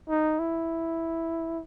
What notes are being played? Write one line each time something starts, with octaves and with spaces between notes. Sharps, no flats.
D#4
E4